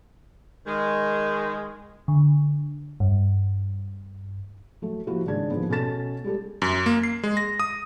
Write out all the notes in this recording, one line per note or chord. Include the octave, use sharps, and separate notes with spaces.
D#3 G#3
D3
G2
F#3 A3
F3 A#3 E4 F#4 G4
G#1 C#3 G#3 D4 G#6
D#2 F3 B3
B2 C#4 A4 A5 A6 E7
G3 G#3 G4 A4
F#2
A#3
C7
G#3
A#6
D#6